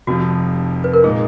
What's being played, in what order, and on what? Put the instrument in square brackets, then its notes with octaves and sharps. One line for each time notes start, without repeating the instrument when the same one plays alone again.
[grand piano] F1 F2 F3 [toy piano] F#4
[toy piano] B4
A#4
[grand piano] A#2 G#3 D#4 [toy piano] G#4